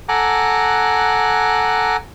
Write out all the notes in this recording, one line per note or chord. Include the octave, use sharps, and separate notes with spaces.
A4 F#5 G#5 A#5 D6 F#6